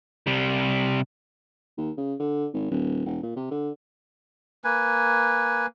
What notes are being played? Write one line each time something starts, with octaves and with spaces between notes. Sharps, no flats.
C3 G3
D#2
C#3
D3
G#1
D#1
E1
A#2
C3
D3
A#3 B4 G#5